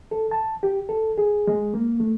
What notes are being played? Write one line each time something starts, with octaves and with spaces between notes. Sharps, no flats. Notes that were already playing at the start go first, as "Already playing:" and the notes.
A4
A5
G4
A4
G#4
G#3
A#3
A3